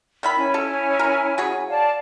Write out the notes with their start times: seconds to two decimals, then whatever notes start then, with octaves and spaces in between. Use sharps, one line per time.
0.23 D#3 E5 B5
0.36 C#4 E4 G#5
0.54 A4
0.99 A#4
1.38 F#3 G#4 C#5
1.69 D5 F5 A5